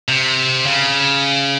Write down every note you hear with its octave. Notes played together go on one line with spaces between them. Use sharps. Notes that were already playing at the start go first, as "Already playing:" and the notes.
C3
C#3